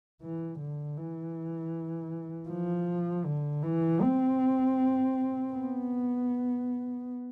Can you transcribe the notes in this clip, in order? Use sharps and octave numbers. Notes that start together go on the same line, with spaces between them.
E3
D3
E3
F3
D3
E3
C4
B3